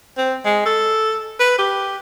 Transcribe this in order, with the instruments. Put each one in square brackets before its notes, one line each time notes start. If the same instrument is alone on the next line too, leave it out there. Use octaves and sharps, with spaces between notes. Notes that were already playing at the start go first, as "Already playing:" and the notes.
[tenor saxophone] C4
G#3
A4
B4
G4